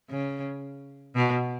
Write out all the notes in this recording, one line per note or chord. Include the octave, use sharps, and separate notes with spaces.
C#3
B2